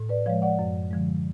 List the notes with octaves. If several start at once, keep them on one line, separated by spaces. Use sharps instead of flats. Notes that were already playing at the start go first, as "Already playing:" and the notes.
Already playing: A2
B4 D5
F3 G#3 C#5 F5
D5 F#5
F#2
D3 F3 G#3